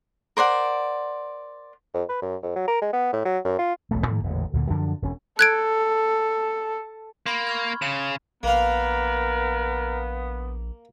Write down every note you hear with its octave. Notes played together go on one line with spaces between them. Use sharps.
A#4 C5 D5 F#5
F2
B4
F#2
F2
F#3
A#4
G#3
B3
A2
F#3
F#2
F4
E1 B1 E2 A3
G#2 D#3 F3 A#3
E1 A1 A#2 D3
D2 A#2 D3
F#2 D3 F3 D4
E1 C#4
A4 F#6 G#6 D7
A#3 B5 C6
C#6 F6 G#6
C#3 E7
A#1 A#3 B3 A#4 F5